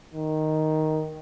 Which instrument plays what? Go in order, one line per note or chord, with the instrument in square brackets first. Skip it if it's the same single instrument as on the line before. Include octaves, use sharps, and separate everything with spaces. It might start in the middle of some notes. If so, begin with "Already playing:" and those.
[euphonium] D#3